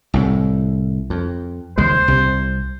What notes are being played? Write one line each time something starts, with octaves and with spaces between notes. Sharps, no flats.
C2 A2
F2
D#2 C#3 G#3 C5
C2 C3